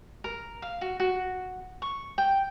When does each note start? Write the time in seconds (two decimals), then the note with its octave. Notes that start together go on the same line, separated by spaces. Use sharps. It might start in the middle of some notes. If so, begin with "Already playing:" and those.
0.24 A#4
0.62 F5
0.81 F#4
1.00 F#4
1.82 C#6
2.18 G5